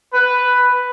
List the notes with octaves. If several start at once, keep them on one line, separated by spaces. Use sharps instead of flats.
B4